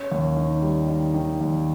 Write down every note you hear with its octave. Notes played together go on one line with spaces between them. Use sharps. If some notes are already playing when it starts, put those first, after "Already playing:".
Already playing: C#4
D#2
D#3
G3
D#3
D#3
D#2